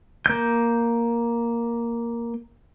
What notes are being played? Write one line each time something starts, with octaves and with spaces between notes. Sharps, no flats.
A#3 G6